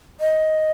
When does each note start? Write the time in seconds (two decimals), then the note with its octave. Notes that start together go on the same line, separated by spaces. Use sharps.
0.20 D#5